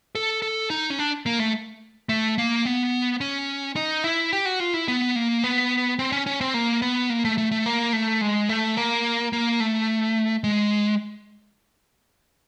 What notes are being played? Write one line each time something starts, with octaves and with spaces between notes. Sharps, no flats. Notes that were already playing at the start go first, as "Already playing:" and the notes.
A4
A4
D#4
C#4
D4
A#3
A3
A3
A#3
B3
C#4
D#4
E4
G4
F#4
F4
E4
B3
A#3
B3
C4
C#4
C#4
C4
A#3
B3
A#3
A3
A3
A3
A#3
A3
G#3
A3
A#3
A#3
A3
G#3